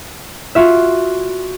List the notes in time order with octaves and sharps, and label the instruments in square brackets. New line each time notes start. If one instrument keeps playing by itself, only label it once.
[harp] F4 F#4 E5